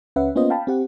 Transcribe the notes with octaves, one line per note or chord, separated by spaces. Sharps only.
C#2 C#4 B4 E5 F#5
A#3 B3 C#4 F4 C5 D#5
F5 G5 A5 B5
C4 G4 F#5